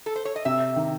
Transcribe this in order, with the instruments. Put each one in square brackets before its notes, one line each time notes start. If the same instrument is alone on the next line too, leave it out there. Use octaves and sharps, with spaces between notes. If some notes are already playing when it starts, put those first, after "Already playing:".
[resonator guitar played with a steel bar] A4
C5
C#5
D#5
[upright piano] C3 [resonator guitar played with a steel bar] E5
[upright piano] D#3